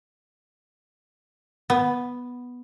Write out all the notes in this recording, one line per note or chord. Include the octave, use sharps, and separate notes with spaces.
B3